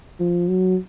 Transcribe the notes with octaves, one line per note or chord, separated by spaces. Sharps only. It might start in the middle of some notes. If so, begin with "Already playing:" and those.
F3
F#3